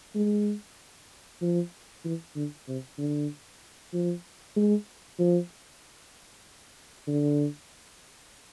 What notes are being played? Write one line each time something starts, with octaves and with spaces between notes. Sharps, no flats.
G#3
F3
E3
D3
C3
D3
F3
G#3
F3
D3